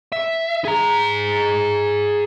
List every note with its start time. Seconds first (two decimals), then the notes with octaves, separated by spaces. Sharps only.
0.12 E5
0.65 G#4 A#5